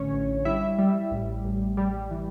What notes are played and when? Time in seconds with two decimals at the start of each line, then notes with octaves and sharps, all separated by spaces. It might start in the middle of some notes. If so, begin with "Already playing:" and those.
Already playing: A1 D3 C#4 C#5
0.12 A1
0.45 G3 E4 E5
0.78 G3
1.11 A1
1.44 A1
1.77 G3
2.11 E3